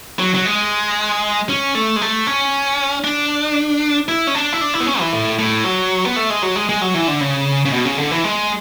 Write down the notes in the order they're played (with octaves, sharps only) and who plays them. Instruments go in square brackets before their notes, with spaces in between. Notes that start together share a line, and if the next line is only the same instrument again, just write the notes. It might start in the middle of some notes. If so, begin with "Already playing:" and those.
[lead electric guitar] F#3
F#3
G#3
C#4
A3
G#3
A3
C#4
D4
E4
C#4
D4
E4
D4
E4
B3
C#4
E3
A2
A2
F#3
B3
A3
G#3
F#3
G#3
G#3
F#3
E3
D3
C#3
C#3
B2
C#3
D3
E3
G#3